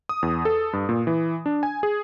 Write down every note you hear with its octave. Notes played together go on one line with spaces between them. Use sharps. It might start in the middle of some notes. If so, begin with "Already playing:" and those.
D#6
E2
A4
G2
A#2
E3
D4
G#5
G#4